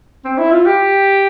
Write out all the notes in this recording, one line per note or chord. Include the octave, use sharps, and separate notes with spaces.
C4
E4
F4
G4